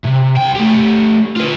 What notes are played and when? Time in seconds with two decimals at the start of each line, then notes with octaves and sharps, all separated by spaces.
0.04 C3
0.36 C2 G5
0.56 A3 G4
1.36 F4 B4